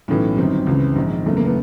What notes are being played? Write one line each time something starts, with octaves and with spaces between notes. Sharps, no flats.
B1 A2 E3 C#4
G1 F#2 D#3 C4
C#2 C#3 E3
A#1 G#2 D#3
F#1 E2 C#3 A3
A#3
B3